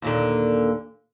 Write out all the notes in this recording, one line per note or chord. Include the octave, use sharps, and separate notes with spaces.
D#2 A#2 D3